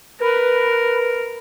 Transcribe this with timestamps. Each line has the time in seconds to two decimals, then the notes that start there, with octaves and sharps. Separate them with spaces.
0.20 A#4 B4